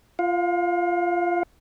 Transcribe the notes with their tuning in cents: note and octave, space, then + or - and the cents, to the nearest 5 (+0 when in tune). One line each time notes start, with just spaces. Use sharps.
F4 -15 F5 +35